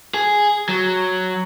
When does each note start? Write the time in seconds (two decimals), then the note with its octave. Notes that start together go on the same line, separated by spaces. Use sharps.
0.14 G#4
0.69 F#3